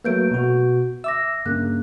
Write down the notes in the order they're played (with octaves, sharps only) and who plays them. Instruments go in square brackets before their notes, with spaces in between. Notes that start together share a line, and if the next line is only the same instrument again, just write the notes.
[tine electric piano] F#3 A3 A#3 [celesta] B4 G6 D7
[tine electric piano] B2 F#4
[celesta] E5 D6 A#6 [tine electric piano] E6
[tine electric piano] G2 C#3 A#3 [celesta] F#6